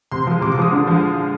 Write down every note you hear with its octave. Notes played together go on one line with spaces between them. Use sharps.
C3 C6
F3 G#3
C3 D6
D6
F3 G#3 D#6
D3
F3 G#3